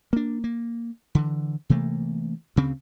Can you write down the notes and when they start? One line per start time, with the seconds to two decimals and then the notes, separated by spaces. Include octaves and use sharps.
0.13 A#3 D4
0.44 A#3
1.15 D3 E3
1.70 C3 E3 A3 A#3
2.56 D2 C#3 C4